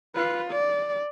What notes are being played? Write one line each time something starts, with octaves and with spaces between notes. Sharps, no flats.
F4 B4
D5